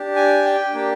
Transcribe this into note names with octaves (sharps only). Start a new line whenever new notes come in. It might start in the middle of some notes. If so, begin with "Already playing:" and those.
Already playing: D4 G4
G#5
G5
A#3 D4 G4